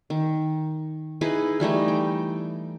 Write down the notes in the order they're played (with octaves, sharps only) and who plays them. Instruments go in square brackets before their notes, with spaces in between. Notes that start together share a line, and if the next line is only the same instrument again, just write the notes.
[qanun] D#3
D#4 E4 G#4 B4
E3 G3 A3 D#4
G5